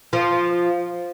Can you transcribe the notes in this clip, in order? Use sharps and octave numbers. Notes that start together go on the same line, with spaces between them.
F3